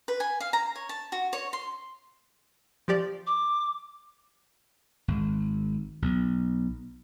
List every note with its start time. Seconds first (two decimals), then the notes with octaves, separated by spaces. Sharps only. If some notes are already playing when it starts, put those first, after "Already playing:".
0.08 B4
0.20 G#5
0.40 F5
0.53 A#5
0.76 C#5
0.89 A5
1.12 F#4
1.33 C#5
1.53 C6
2.88 F3 G4 D5
3.27 D6
5.08 G#1
6.02 B1